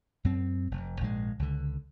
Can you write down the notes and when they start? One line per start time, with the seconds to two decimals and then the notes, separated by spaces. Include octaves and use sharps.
0.24 F#2 C4
0.71 F1
1.01 A#1 G#2 G#3
1.39 C#2 D3